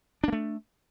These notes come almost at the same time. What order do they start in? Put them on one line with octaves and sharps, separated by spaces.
D4 A#3 A3